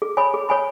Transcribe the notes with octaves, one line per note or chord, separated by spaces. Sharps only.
G#4
C#5 G#5 B5
G#4
C#5 G#5 B5